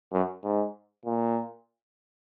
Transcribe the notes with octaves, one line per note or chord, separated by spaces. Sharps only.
F#2
G#2
A#2